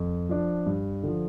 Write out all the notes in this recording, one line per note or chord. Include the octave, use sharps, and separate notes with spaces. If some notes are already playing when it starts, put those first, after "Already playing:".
Already playing: F2
F3 D4
G2
D3 F3